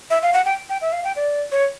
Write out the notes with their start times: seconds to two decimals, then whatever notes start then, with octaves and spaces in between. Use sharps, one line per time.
0.10 E5
0.22 F5
0.33 F#5
0.45 G5
0.69 G5
0.81 E5
0.92 F5
1.04 G5
1.16 D5
1.52 C#5